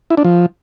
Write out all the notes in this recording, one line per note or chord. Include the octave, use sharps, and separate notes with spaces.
E4
D4
F3